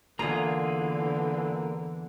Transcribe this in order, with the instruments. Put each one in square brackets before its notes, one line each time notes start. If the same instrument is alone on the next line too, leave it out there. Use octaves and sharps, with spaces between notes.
[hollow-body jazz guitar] E2 A#5 [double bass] D3 E3 [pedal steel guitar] A#3 F4 G#4